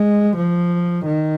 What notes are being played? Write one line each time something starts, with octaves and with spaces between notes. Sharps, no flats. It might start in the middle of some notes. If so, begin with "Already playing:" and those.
Already playing: G#3
F3
D#3